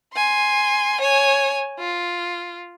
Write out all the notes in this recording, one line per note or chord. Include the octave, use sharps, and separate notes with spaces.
G#5 C6
C#5 G#5
F4